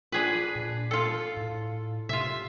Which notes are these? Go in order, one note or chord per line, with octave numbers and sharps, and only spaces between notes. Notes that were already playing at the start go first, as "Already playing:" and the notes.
D4 F4 G#4 B4
A#2
F4 A4
A2
C3 F4 E5